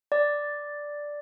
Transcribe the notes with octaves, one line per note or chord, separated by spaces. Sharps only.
D5